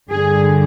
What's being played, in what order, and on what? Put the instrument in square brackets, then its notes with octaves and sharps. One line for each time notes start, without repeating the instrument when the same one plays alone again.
[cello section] G2 D3 G3 G#4